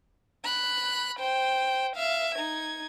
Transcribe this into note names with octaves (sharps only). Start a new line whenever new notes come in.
B5 F#6
C5 G5
E5 F5
D#4 G#6